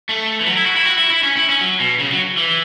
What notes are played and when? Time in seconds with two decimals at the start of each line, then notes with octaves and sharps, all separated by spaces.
0.09 A3
0.40 E3
0.46 F#3
0.57 E4
0.66 F#4
0.76 E4
0.85 F#4
0.98 E4
1.10 E4
1.23 C#4
1.36 E4
1.49 C#4
1.61 F#3
1.80 B2
2.00 C#3
2.12 F#3
2.37 E3